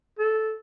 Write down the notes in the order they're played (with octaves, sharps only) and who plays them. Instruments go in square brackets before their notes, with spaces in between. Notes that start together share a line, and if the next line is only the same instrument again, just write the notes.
[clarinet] A4